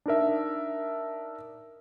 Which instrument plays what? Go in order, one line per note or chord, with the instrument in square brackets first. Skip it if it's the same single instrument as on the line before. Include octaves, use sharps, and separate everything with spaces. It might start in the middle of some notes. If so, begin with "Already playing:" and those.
[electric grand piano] D4 D#4 A#4 E5